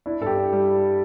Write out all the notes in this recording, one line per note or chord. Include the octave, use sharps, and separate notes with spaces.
D4 E4
G2 A4
G4
D4
G3